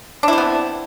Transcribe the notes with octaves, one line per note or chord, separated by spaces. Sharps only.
B3 C4 D4 E4